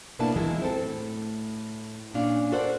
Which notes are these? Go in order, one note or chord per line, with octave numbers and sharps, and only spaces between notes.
B2 A#3 B3 D4 E4 A5
E3 F#3 G#3 B3 E4 F4
C4 A4
A2
A#2 C#4 D4 F5
F#4 A4 A#4 C5 D5 F#5